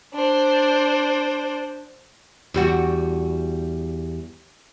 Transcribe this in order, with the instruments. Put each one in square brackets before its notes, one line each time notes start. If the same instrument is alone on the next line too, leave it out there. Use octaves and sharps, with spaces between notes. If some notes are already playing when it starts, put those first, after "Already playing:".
[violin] D4 C5
[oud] E2 G3 F#4